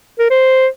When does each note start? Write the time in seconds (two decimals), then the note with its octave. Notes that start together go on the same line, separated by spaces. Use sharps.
0.19 A#4
0.30 C5